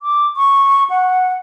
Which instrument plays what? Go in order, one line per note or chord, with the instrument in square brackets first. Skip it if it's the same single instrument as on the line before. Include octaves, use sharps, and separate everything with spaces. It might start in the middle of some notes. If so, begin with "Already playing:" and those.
[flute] D6
C#6
F#5